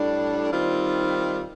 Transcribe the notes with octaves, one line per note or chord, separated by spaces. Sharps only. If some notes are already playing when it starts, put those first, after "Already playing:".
Already playing: A2 G3 D4
D#3 G3 C4 F4